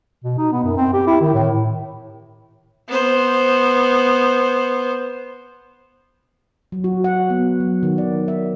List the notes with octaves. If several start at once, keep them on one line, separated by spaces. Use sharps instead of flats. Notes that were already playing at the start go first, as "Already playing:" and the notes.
B2
D#4
B3
F#2
C4
G4
E4
D#3
A2
B3 C5
F#3
F#4
F#5
B3
F#3
D#3
D5
E5